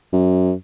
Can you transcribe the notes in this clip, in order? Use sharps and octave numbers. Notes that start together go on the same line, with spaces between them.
F#2